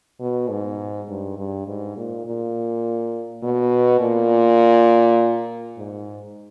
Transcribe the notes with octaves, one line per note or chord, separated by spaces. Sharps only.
B2
G#2
G2
G2
G#2
A#2
A#2
B2
A#2
G#2